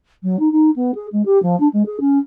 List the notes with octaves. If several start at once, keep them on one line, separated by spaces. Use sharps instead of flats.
F#3
D#4
D#4
B3
G#4
G#3
G4
F3
D4
G#3
G#4
C#4